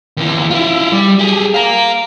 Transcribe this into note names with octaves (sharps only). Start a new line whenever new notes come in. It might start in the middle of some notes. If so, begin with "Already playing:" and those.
D#2 E3
E4 F4
G3
G4 G#4
F5 A#5